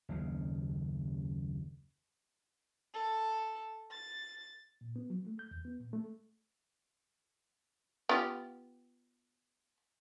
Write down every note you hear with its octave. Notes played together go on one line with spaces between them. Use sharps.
F#1 D#2 C#3
A4
A6
A#2
B3
F#3
A3
G6
E2
B3
A#2
A3
B3 F4 G4